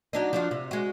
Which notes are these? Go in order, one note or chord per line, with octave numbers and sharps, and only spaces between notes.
F#3 D4 D#4
F3 D4 F#4
C3
G#3 F#4